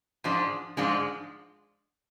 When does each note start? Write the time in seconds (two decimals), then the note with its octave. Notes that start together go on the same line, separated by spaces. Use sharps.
0.24 G#2 F3 G#3 D4
0.77 G#2 F3 G#3 D4